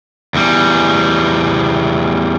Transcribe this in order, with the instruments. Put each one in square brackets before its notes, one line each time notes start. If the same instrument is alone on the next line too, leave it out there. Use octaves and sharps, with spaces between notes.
[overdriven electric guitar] E2 G3